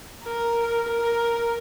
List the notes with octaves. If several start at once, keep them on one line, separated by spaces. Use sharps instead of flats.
A#4
A#4